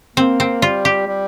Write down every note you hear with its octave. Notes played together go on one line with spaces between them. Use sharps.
A#3 C4
C4
G3 F4
G4
G3